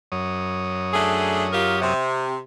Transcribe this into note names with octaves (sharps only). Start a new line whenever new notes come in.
F#2 C#5 D#6
A3 D4 G#4
F4 G4 A#4
C3